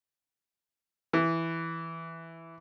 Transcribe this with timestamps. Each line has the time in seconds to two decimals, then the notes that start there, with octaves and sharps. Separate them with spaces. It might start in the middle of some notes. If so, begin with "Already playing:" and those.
1.13 E3